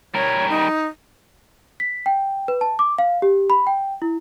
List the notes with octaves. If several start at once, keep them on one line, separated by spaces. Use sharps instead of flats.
G3 A#4 C#5
D#4
B6
G5
B4
A5
D6
F5
G4
B5
G5
E4